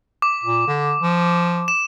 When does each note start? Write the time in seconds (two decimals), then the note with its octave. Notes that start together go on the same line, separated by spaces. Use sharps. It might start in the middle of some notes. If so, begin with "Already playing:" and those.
0.22 D6
0.43 A#2
0.67 D3
1.01 F3
1.68 E7